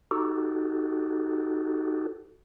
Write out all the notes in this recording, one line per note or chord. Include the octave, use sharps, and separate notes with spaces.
D#4 F#4 G4 A4